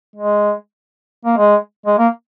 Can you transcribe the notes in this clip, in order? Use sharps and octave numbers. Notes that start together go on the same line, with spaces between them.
G#3
A#3
G#3
G#3
A#3